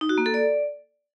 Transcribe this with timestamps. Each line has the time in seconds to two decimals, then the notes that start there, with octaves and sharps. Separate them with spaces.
0.01 D#4
0.09 F#4
0.18 A#3
0.26 A4
0.34 D5